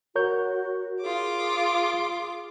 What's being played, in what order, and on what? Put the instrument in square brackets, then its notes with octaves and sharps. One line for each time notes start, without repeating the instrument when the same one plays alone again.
[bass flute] F#4 [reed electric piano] A#4 C#5 G6
[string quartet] F4 D6 [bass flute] G#4